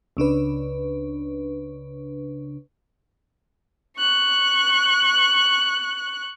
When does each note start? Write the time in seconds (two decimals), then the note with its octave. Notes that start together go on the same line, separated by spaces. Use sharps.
0.17 C#2 C#3 D4 B4
3.99 C#6 F#6